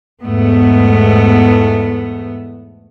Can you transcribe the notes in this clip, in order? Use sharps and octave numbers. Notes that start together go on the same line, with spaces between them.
E2 G#2 A3 B3